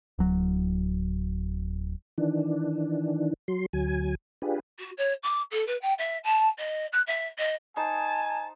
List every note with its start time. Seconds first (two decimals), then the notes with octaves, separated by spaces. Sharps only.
0.19 D1 F#3
2.18 D#3 E3 D4
3.48 F#3 C6
3.73 D2 F#3 G#5
4.42 D4 F4 G4 G#4 B4
4.79 F#4
4.97 C#5
5.23 D6
5.51 A4
5.67 B4
5.81 G5
5.98 E5
6.23 A5
6.58 D#5
6.92 F#6
7.06 E5
7.38 D#5
7.77 D#4 C5 G#5 A5